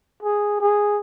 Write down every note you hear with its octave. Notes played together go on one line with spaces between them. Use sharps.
G#4
G#4